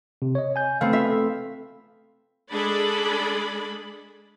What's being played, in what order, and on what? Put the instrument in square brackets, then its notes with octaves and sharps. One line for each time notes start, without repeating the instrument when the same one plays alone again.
[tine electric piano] C3
C#5 D#5
G#5 G6
[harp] A3 B3 C4 [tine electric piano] F5
[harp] F4 E5
[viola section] G#3 D4 G#4 A4 D5 B5